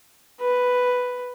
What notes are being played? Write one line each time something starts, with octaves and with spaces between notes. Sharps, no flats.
B4